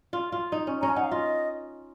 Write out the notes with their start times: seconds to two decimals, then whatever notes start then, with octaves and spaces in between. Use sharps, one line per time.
0.13 F4
0.32 F4
0.52 D#4
0.67 C#4
0.81 C#4 A#5
0.89 G#5
0.96 D#4 F#5
1.04 F5
1.11 F4 D#5